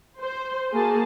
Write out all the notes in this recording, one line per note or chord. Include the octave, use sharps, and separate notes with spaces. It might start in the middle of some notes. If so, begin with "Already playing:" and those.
C5
A#3 F#4 G#4 A5